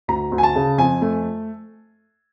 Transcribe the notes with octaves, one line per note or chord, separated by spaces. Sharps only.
D2 A#5
D2
G#5
A5
C#3
F2 G#5
A3